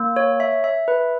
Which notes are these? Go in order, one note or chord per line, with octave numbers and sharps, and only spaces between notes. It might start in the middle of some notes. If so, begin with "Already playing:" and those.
Already playing: A#3
C#5
E5
E5
B4